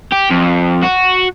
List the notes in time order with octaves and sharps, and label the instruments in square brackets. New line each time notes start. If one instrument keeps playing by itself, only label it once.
[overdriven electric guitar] G4
F2
F#4